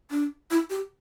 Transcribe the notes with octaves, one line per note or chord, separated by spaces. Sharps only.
D4
E4
G4